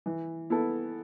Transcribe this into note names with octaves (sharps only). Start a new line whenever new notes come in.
E3
B3 E4 A4